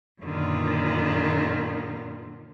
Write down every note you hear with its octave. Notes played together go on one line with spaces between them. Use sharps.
F#2 A#2 D3 D#3 B3 F4